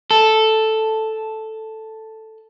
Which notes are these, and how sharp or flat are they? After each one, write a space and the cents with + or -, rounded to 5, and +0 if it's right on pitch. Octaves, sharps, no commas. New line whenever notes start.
A4 +0